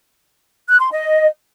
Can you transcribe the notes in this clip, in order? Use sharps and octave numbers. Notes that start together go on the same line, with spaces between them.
F#6
C6
D#5